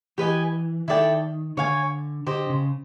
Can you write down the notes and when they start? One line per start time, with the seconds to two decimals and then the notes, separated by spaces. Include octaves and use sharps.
0.18 E3 G4 B4 D#5 G#5
0.88 D#3 E4 A4 D5 G5
1.57 D3 C#5 F5 G#5
2.27 D3 G4 C5 D#5
2.49 C#3